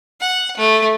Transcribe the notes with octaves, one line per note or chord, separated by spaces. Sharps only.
F#5
A3